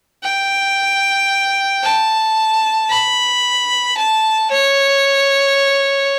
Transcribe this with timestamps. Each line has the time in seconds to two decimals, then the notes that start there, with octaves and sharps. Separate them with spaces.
0.23 G5
1.83 A5
2.89 B5
3.97 A5
4.50 C#5